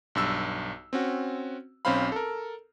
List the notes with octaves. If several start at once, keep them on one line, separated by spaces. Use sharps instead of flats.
B1 G2 E6
C4 C#4 F#4
B1 C4 C#4 C5 F5 B5
A4 A#4